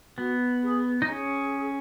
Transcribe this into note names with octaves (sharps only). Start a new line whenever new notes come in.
B3 F#4
G#4
D#4
C#4 G#4